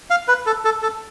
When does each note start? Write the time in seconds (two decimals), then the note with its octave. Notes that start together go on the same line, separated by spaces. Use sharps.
0.10 F5
0.28 B4
0.46 A4
0.65 A4
0.83 A4